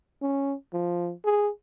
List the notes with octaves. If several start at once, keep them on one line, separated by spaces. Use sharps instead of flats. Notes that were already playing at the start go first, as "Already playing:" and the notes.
C#4
F3
G#4